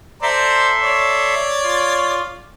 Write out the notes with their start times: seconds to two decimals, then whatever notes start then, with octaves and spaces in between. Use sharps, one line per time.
0.22 A4 C5 D5 E5 A#5 C6
0.82 C#5 D5
1.63 F4